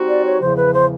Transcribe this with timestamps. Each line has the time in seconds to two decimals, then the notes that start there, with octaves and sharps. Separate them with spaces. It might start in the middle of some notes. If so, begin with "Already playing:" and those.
Already playing: G3 C4 D#4 F#4
0.08 D5
0.25 C#5
0.41 E2 C#3 F3 C5
0.56 B4
0.74 C5